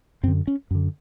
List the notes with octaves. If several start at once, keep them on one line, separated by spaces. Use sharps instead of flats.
F#2 D3 C4
C#4
F#2 D3